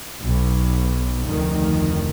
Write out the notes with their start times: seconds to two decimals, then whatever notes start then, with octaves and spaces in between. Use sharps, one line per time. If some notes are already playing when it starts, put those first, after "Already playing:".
0.21 B1
1.25 F1 D2 D#3